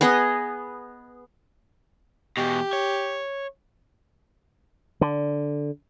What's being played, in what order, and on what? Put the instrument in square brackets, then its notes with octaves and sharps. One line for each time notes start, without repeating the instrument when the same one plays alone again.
[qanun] B3 G#4 D#5
[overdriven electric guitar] E2 B2 [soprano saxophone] G4
[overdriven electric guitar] C#5
[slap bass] D3